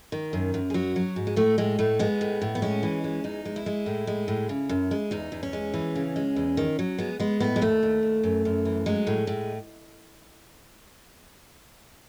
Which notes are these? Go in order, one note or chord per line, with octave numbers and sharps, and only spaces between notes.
D#3
F#2
F#2
G#4
F#3 F#4
F#3
G#2
G#3
A2 A3
A2 G#3
A2 A3
G#3 B3
A2
A2
B3
G#3 C#4
E3
G#3
E2 D#4
G#3
E4
G#3
A2
G#3
A2
C#3
F#2
G#3
E2 D#4
E2
C#4
G#3
E3
C#3
G#3
E2
D#3
F#3
G#3 B3
G#3 B3
A2 B3
G#3
D#2 A3
D#2
D#2
F#2
F#2
E3
F#3 G#3
A2
A2